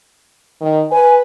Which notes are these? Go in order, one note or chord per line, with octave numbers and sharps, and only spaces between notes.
D#3
B4 G#5